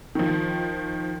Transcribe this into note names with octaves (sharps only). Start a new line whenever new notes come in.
D#3 F3